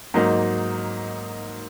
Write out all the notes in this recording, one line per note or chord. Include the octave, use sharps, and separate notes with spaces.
G#2 F#3 A#3 D#4